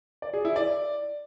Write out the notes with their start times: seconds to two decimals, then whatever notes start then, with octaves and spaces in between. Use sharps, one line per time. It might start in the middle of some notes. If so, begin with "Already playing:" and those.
0.22 D5
0.33 G#4
0.45 E4
0.56 D5